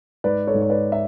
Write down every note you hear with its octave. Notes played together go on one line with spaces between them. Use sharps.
G#2 B4 D5
A4 C#5
G#2
C#5
B4 D5
E5